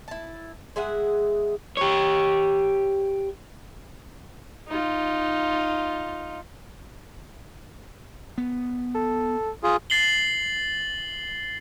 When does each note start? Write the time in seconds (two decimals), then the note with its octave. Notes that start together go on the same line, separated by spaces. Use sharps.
0.08 E4 A5
0.76 G#3 G#4 E5 F#5
1.77 G4 C#5
4.68 D#4 F4
8.38 B3
8.94 A4
9.63 F4 G#4
9.90 A6 C7 F#7 G7